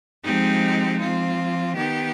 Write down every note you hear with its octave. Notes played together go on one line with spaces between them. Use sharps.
F3 G#3 C4 D#4 G4
F3 C4 F4
D#3 B3 D#4 G4